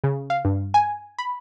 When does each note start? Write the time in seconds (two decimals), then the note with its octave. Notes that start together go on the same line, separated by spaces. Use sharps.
0.04 C#3
0.30 F5
0.45 G2
0.74 G#5
1.19 B5